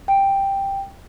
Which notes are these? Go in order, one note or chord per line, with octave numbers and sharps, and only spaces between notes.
G5